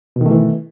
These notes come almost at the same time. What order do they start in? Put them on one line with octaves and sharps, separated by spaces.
B2 D#3 A3 E3